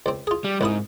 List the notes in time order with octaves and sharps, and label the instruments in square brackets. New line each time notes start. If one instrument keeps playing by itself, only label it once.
[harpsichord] C#2 C4
F4 G#4
[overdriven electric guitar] G3
[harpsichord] C2 E4 D#6 [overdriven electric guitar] G#2